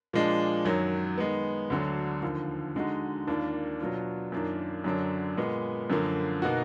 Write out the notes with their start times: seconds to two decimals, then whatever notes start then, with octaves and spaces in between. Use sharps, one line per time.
0.13 A#2 F3 G#3 D4
0.65 F#2 D#3 F#3
1.18 D#3 G#3 B3
1.70 D2 D3 F#3 D4
2.23 D#2 D3 F3
2.76 D3 G#3 D#4 F#4
3.27 D#2 D#3 A#3 D4 F4
3.80 B2 F#3 D4 F4
4.32 F#2 D#3 A#3 D4 F4
4.84 F#2 D3 F#3 D4
5.37 A#2 G#3 B3
5.90 F#2 D3 F3 A#3
6.42 B2 A#3 D#4 F#4